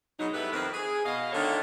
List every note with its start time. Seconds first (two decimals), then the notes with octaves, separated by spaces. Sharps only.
0.18 G#2 B2 F#3 D#4
0.34 G3 A3 B3 E4 B4
0.52 F2 D#3 C4 A#4 B4
0.72 G#4
1.04 B2 D#5 F5
1.33 D3 D#3 A3 F4 A4 C#5